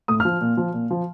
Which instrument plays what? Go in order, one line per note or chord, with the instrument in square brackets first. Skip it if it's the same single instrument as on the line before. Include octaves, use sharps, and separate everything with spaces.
[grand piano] A2 D#6
F6
F3
A#2
F3
A#2
F3